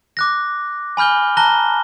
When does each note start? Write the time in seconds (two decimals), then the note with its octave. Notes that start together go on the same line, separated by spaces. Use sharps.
0.17 D6 F#6 A#6
0.97 G#5 B5 F6 G6 G7
1.37 A5 A#5 F#6 A#6 G7